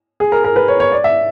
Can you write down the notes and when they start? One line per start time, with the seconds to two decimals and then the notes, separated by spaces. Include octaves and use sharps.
0.20 G#4
0.32 A#4
0.44 A#4
0.56 B4
0.68 C#5
0.80 C#5
0.92 D5
1.04 E5